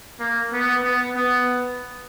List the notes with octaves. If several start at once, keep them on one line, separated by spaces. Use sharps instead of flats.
A#3
B3
B3
B3